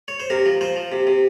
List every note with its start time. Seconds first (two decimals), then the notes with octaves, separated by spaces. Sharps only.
0.08 C#5
0.20 C5
0.30 C3 A#4
0.46 F3
0.61 F3 C5
0.76 F3
0.92 C3
1.07 C3